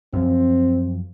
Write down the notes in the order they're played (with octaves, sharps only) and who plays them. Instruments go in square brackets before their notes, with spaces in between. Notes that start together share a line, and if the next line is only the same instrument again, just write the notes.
[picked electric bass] F#2 F3 [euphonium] C4